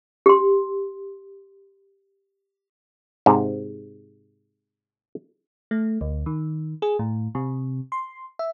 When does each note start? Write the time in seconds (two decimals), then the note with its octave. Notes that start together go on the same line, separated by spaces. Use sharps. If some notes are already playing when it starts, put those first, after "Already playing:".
0.26 G4 C6
3.26 G#2 C3
5.71 A3
6.01 D2
6.26 D#3
6.82 G#4
6.99 A2
7.35 C3
7.92 C6
8.39 E5